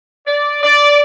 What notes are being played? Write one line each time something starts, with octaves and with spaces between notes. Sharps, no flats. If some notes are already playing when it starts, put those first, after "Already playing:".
D5
D5